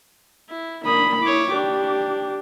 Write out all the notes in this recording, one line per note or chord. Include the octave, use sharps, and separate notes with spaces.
E4
A#3 D4 B5 D#6
E4 C#5 D6
D4 G4